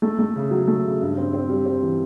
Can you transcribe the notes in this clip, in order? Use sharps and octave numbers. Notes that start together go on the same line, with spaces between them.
A3
A3
C#3
F#3
A3
C#3
G2
C4
C4
G3
C4
E3